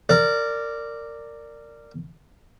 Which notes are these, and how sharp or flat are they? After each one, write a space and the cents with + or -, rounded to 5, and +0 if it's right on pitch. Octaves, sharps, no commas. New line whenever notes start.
A#4 -20 D5 +0